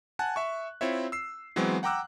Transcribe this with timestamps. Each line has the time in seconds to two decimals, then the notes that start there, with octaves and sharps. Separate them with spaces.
0.19 F#5 G#5 A5 F#6
0.36 E5 C#6
0.81 C4 E4 F4 C#5 E5
1.12 E6 C7
1.56 E3 F#3 G#3 B3 C4
1.83 F#5 G5 A#5 D6 E6 F#6